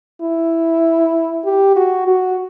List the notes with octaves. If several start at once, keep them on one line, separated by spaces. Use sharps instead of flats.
E4
G4
F#4
F#4